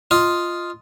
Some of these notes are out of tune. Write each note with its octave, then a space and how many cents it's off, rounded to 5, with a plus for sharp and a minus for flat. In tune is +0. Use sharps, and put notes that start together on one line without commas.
F4 +0 D#5 +0